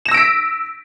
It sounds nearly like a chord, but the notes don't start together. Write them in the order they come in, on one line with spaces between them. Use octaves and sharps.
E7 A#6 E6 D7 B6